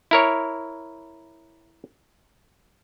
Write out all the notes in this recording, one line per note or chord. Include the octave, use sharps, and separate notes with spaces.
E4 A#4 C#5